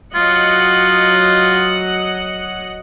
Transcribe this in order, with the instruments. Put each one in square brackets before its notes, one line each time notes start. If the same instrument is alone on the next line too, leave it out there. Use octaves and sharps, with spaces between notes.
[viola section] F#3 D#5 F#5 [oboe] F4